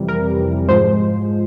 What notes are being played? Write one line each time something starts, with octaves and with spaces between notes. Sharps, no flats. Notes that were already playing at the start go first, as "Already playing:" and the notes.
Already playing: F2 C3 E3 G3
A#4
G#2 F3 G#3 C5